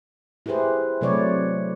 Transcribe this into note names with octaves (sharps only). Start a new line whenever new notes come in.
E4 G4 G#4 B4 C5
C3 F#3 A3 B4 C#5 D5